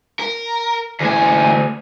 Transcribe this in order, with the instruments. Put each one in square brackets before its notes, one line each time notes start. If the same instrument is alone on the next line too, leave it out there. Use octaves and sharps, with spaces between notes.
[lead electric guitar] A#4
[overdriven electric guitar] D2 G#5 [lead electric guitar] A#2 E3